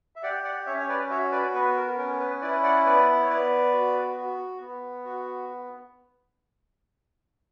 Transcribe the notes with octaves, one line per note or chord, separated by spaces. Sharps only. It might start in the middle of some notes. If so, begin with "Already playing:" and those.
E5
G4 D5 F#5
D5 F#5
C#4 C#5 E5
C#5
B4 D5
F#4 C#5 E5
B4 D5
B3 B4
A#4
C#4 A#4
B4
E4 B4 D5
D5 F#5
B3 B4 D5
C#5
B3 B4 D5
F#4
F#4
B3
F#4